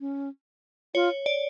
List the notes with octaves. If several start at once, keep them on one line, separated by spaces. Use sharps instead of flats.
C#4
F4 C#5
D5